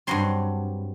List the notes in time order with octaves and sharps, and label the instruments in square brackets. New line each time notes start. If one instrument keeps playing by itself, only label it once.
[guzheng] G2 F#3 C4 C6